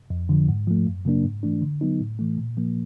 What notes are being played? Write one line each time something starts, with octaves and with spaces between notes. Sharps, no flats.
F2
D3 F3
G#2
F3 A3
F#2
C#3 F#3 A#3 D4
G#2
E3 A3 D4
D3
F#3 B3 D#4
A2
E3 A3
A#2
F3 A#3